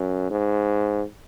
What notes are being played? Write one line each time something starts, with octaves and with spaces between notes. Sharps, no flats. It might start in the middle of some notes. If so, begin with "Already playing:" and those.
Already playing: F#2
G#2